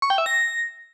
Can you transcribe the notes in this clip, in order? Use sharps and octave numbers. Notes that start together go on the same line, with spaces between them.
C#6
G5
E5
A#6